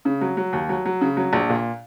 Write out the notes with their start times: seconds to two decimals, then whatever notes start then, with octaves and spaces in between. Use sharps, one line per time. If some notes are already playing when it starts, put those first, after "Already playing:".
0.05 C#3
0.21 F#3
0.37 F#3
0.53 D#2
0.69 F#3
0.85 F#3
1.01 C#3
1.17 F#3
1.33 A#1
1.49 A#2